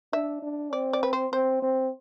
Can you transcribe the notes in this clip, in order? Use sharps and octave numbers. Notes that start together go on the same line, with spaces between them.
D4 E5
D4
C4 D5
D5
B4
C5
C4 C5
C4